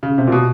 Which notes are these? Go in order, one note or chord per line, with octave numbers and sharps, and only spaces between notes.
C#3
C3
A#2
B2